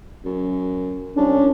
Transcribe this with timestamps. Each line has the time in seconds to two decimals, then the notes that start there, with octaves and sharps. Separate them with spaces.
0.25 F#2
1.17 C2 C#4 D4